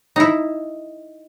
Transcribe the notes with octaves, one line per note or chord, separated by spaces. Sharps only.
D#4 E4